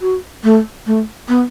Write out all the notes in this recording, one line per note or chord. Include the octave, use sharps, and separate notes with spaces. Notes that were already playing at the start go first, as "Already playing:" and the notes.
F#4
A3
A3
B3